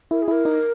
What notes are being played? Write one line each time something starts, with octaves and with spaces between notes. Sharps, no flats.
E4 A#4
G#4
E4 A#4
D#4